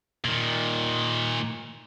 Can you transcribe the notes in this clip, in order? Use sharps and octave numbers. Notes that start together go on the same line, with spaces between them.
A#2 D#3